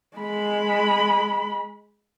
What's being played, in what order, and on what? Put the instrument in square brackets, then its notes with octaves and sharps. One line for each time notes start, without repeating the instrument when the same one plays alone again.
[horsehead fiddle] G#3 B5